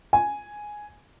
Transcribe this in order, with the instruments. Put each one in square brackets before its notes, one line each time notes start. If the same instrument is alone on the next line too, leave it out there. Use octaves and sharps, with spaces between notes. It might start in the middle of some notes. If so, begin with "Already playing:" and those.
[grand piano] G#5